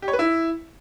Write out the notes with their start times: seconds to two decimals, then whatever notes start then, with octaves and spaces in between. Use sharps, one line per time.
0.02 G4
0.08 C#5
0.13 B4
0.19 E4